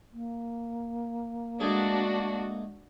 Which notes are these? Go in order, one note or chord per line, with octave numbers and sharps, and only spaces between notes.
A#3
G#3 A3 D4 F#4 G#4